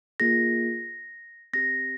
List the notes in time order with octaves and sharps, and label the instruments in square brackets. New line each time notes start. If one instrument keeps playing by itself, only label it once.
[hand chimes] A#3 F4 G#4 A#6
C4 G4 A#6